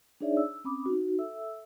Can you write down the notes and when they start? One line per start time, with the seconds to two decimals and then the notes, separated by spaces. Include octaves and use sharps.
0.21 D4 D#4 G#4 C#5 D5 E5
0.37 E6
0.64 C4 C#4 B5 D6 D#6
0.86 D#4 F#4
1.18 A4 E5 E6